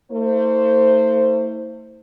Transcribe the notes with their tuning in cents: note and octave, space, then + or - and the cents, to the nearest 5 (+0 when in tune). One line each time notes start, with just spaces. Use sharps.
A3 +40 E4 -40 C5 +0